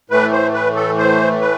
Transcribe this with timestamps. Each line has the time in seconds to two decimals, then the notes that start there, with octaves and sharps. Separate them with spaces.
0.10 A2 E3 A3 B4
0.32 C5
0.54 B4
0.76 A4
0.98 C5
1.41 B4